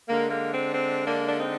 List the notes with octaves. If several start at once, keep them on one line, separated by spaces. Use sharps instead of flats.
D3 G#3 A#3
A#3
C4
C4
A#3 D4
D4
C4 D#4